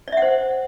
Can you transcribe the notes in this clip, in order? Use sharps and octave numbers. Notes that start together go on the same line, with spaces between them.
C5 D5 E5 F#5